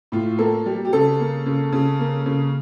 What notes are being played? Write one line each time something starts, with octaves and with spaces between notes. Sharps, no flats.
A2 F4
A#3 A4
G3
G4
C#3 A4
A#3
C#3
C#3
A#3
C#3